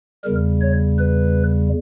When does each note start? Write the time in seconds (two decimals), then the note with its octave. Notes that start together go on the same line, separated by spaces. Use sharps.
0.24 E2 C#3 G3 A#4
0.61 C#5
0.99 B4